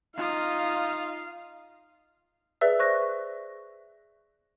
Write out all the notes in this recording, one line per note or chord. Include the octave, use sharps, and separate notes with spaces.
D#4 F4 F5 D#6
G#4 B4 D5 E5 E6
C5 C#6 F#6 A#6